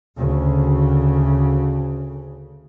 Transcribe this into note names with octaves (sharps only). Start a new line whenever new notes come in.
D2 C#3